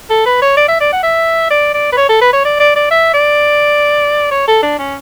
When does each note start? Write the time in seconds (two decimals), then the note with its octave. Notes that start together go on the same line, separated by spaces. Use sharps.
0.10 A4
0.26 B4
0.42 C#5
0.57 D5
0.68 E5
0.80 D5
0.93 F#5
1.03 E5
1.51 D5
1.74 D5
1.93 B4
1.97 C#5
2.09 A4
2.21 B4
2.33 C#5
2.45 D5
2.60 D5
2.76 D5
2.91 E5
3.14 D5
4.32 C#5
4.48 A4
4.63 D4
4.79 C#4